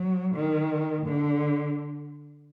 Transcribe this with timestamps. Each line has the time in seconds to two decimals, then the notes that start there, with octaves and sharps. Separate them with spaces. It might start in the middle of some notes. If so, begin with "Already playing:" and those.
Already playing: F#3
0.35 D#3
1.05 D3